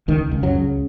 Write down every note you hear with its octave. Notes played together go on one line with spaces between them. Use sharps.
C#2 D#3
C#2
F#2 F#3
C#3